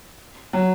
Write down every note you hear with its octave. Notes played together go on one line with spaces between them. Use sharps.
F#3